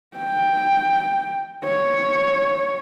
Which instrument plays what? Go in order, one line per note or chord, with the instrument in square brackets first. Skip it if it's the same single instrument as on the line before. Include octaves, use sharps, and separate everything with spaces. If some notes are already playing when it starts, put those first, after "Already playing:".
[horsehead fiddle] G5
C#5